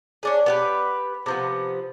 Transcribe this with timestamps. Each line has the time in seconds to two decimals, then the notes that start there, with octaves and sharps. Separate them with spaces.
0.23 C#4 D4 G#4
0.46 B3 G4 B4
1.26 C3 F3 B3